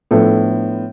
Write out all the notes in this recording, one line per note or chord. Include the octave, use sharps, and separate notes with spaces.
A2 F3 B3 D4 A4